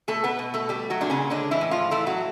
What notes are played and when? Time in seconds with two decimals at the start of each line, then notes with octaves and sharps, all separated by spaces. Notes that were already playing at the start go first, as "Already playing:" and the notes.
0.08 B2 A3 A4
0.24 B3 B4
0.39 B2
0.54 A3 A4
0.69 G3 A3 G4
0.90 F#3 F#4
1.01 A#2 D4
1.10 C#3 C#4
1.30 D3 G#3 D4
1.51 E3 E4
1.61 A2
1.71 F3 F4
1.91 E3 A3 E4
2.06 F#3 F#4